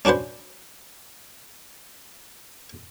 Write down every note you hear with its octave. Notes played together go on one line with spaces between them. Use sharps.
C#4 D4 F#4 B4 C5